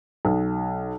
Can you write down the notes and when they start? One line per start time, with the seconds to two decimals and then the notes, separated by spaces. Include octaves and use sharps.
0.25 B1